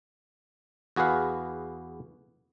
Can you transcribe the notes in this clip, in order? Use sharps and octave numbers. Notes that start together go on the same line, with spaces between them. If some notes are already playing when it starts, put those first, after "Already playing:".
E2 F#4 G#4 B4 F5 F#5